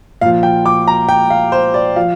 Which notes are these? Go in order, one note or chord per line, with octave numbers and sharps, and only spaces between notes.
A#2 F3 F5
G5
D6
A#5
G5
F5
C5
D5
F3 F5